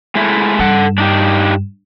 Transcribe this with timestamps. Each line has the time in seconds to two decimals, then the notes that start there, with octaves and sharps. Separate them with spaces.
0.15 G#3 A3 E4
0.59 G2 A4 F#5
0.98 D4 D#4 G4